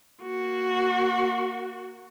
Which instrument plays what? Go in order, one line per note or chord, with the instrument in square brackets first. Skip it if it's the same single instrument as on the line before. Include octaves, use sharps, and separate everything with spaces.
[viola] A#3 F#4